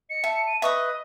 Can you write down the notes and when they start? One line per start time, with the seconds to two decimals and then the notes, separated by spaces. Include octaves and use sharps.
0.10 D#5 C#7
0.24 E5 A5
0.47 D#7
0.62 B4 D#5 E5 C#6 D#6